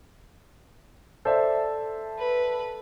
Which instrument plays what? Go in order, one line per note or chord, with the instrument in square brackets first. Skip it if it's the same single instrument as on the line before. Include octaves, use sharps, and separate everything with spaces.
[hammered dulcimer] A4 [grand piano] C5 D5 E5
[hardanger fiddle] B4